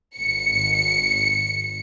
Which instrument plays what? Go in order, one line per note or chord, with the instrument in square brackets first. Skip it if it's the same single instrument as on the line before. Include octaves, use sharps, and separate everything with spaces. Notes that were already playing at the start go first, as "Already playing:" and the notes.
[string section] G#1 C#7